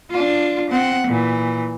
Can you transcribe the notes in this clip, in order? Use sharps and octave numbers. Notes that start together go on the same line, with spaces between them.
D4 F4
C4 F#5
A#2 E3